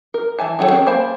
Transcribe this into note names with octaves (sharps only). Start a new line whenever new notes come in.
A#4
E3 E5 G#5 A5
D#3 F#3 F#4 A4 C#5
C4 C#4 G#4 A#4
A#3 C5 G#5 A5 B5